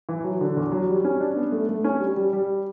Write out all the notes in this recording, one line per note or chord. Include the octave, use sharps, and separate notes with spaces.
E3
F#3
D3
E2
F#3
G3
C#4
D4
B3
A3
A3
C#4
G3
G3
G3